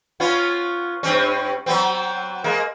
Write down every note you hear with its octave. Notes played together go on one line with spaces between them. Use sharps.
B3 C#4 F4
G2 C4 C#4
F#3 B3 C4
G#3 A#3